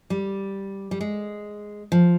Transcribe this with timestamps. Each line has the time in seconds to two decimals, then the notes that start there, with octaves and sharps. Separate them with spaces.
0.10 G3
0.91 G3
1.01 G#3
1.92 F3